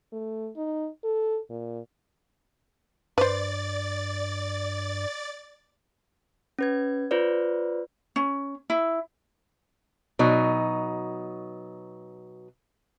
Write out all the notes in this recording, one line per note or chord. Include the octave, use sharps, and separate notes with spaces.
A3
D#4
A4
A#2
G2 B4 C5 D5 A6
C#4 B4 G#6
F4 B4 C5 D5
C#4
E4
B2 F#3 D#4